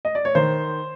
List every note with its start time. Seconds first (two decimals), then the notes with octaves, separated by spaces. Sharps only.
0.05 D#5
0.15 D5
0.25 C#5
0.35 D#3 C5